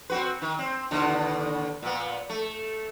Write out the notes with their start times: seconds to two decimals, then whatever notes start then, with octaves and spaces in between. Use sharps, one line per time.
0.10 C4 F#4 B4
0.42 D#3
0.59 C4
0.91 D#2 B2 D3
1.82 A#2 B3
2.30 A3